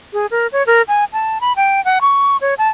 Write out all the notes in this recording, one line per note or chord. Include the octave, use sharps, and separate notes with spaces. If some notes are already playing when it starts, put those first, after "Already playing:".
G#4
A#4
C#5
A#4
G#5
A5
B5
G5
F#5
C#6
C#5
A5